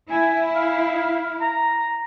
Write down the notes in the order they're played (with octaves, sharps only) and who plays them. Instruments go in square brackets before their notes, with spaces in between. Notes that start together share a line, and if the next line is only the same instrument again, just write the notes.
[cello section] E4 [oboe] G#5
[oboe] F5
A#5